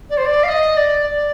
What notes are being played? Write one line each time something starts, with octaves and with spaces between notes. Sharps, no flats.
D5
C5
D5
F5
D#5
D5
D5